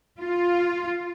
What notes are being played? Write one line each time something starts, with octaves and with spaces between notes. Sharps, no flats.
F4